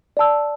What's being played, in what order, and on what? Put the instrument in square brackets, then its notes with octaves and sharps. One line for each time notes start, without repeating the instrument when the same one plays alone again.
[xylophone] D5 A5 E6